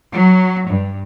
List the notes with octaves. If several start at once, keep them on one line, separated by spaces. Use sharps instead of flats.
F#3
G2